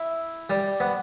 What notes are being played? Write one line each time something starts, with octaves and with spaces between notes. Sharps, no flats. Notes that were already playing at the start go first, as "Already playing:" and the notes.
Already playing: E4
G3
B3